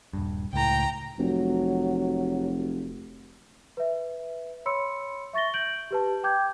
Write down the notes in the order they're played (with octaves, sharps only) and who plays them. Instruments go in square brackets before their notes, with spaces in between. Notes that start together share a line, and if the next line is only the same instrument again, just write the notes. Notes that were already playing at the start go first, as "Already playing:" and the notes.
[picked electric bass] D#1 G2
[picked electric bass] C#2 A2 [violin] G5 A#5
[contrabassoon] F1 [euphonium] F#3
[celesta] B4 E5
C#5 B5 C6 E6 C#7
E5 C#6 A6 A#6 G7
G6 D7 F#7
G4 B4 A5
G5 D6 G6 G#6